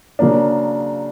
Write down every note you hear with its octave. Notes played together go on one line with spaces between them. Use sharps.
C#3 F#3 A#3 D4